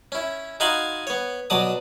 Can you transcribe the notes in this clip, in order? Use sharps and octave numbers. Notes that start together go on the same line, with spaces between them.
C#4 E4
D#4 F#4 F5 G#5 B5 C6
B3 C#5
B2 F#3 D5 A5 D#6